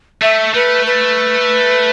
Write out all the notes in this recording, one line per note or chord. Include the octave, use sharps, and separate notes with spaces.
A3 E5
A3 B4
B4